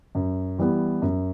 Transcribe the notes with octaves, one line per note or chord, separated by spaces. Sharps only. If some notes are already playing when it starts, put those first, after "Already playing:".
F#2
E3 G3 B3
F#2